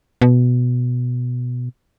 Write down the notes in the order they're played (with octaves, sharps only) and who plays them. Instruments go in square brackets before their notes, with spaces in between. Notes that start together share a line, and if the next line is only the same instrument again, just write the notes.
[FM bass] B2